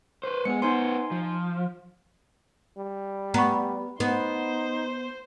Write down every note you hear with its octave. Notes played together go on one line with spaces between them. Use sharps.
B4 C5
G#3 B3 G#4 C#7
B3 D#4 C5 G#5 C6
F3
G3
B3 A#5 B5 C#6
B3 D#4 C5